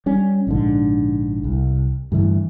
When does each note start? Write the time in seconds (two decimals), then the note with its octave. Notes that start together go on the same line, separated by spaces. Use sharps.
0.06 G3 C#4
0.47 A#1 G#2 D3
1.44 C2
2.12 G2 D3 E3 A3